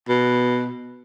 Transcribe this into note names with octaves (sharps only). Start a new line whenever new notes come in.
B2